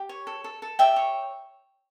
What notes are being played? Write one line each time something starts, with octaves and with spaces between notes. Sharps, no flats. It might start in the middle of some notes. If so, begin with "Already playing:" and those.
Already playing: G4
C#5
A4
A4
A4
G4 E5 G5
C#5